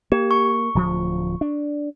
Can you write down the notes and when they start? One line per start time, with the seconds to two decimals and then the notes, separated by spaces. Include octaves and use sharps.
0.12 A#3 G4
0.31 C#6
0.75 D1 D2 F3
1.41 D4